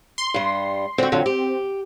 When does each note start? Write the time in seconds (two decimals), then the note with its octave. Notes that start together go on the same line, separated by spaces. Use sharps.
0.18 C6
0.34 G2 G3
0.98 D3 C4 F#4
1.12 F2 D3 F#3
1.26 G4